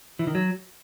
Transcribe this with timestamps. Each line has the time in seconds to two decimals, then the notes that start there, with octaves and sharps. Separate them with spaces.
0.19 E3
0.27 D#3
0.35 F#3